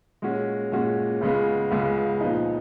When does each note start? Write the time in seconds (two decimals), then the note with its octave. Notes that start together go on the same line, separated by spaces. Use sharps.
0.22 A#2 G#3 C#4 F#4
0.72 A#2 G#3 C#4 F#4
1.21 C#2 C#3 G#3 B3
1.71 C#2 C#3 G#3 B3
2.21 A#2 F3 B3 D#4